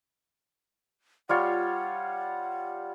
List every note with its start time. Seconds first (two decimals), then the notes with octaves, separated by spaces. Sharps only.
1.29 G3 F4 C#5 F#5